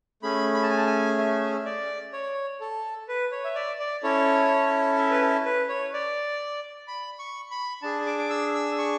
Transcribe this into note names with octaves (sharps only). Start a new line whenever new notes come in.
A3 C#4 G#4 B5
B5
A5
G#5
A5
G#5
E5
D5
C#5
A4
B4
C#5
E5
D5
D5
C#4 E4 A4 C#5
E5
B4
A4
B4
C#5
D5
B5
C#6
B5
D4 G#4 A5
D6
D6
E6
E6
C#6